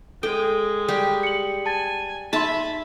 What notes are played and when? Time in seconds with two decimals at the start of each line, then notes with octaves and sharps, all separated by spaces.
0.23 G#3 A4 G5
0.88 G3 G4
1.23 C#7 F#7
1.66 G#5 A5 A6
2.33 D#4 E5 A5 B5 C6